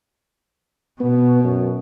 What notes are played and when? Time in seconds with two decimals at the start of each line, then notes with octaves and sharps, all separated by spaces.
1.00 B2 B3
1.44 F#2